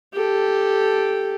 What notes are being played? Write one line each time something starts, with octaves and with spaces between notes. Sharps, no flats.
G4 A4